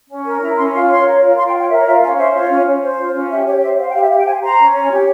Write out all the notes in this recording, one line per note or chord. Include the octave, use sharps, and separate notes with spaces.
C#4
A#4
E4 A#5
C#4 C6
F4 C6
C#5 C6
A#4
F4
F4 C6
G5
C#5
G5
A#4 E5
C#5
F4 E5
C#4 F5
C5 E5
F4 C#5
C#4
C#4
C5
F4
C#4
G4 E5
G4 C#5
C5 E5
C5 F5
G5
G4 F5
E5
G4 F5
G5
C5 G#5
C5 A#5
C#4
C#5
G4